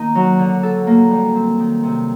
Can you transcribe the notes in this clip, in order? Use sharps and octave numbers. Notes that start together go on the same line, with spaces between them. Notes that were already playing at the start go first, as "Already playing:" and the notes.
Already playing: D#3 A#3 D#4
F#3
D3
A4
A#3
G3
C4
D#3
C3